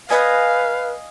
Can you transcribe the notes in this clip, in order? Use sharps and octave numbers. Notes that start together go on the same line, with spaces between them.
B4 D#5 F5 G#5